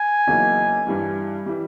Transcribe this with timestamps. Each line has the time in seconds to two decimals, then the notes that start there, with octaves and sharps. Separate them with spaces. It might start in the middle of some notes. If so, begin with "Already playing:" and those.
Already playing: G#5
0.27 E2 C#3 F#3 A#3 D#4
0.87 G2 E3 G3
1.46 E3 G3